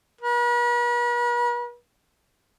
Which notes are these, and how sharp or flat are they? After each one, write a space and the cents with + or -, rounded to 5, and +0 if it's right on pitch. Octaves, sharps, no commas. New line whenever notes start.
B4 -45